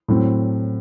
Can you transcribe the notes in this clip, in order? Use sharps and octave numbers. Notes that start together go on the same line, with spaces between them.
A2 F#3 C4